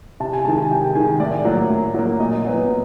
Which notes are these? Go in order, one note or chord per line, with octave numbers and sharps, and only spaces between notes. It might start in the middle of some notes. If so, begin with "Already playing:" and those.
C3 A5
G#5
D#3 G#3 A5
G#5
C3 G5
D#3 G#3 G#5
A2 D5
F#3 A#3
A2
F#3 A#3
A#2 D#5
F#3 B3
A#2